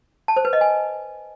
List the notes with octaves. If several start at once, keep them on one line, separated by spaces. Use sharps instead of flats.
A5
C5
B4
D#5
G#5